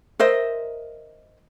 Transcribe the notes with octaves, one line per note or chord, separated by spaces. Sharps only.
A#4 C5 D#5 E5